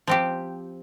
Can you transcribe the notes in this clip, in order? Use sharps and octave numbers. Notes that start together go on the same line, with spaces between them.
F3 C4 G4